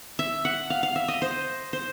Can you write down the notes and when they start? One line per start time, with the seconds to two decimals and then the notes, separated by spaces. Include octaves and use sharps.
0.19 E5
0.45 F#5
0.70 F5
0.83 F5
0.96 E5
1.08 D#5
1.22 C5
1.73 C5